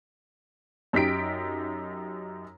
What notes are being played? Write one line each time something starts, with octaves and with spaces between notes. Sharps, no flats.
F#2 D#4 G4 B6 D7